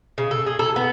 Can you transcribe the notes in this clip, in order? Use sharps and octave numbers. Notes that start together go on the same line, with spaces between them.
C#3
A4
G#4
A4
B3